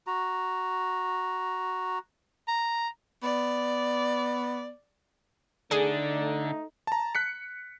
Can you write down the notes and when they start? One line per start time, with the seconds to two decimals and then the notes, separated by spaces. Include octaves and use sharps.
0.07 F#4 A#5
2.48 A#5
3.23 B3 D5
5.71 D3 A3 D#4 G#4 D5
6.87 A5 A#5
7.15 F#6 B6 C#7